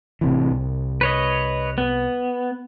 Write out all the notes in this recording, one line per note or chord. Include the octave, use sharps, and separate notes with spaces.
A1 C3 E3
C2
B4 C#5 D#5
B3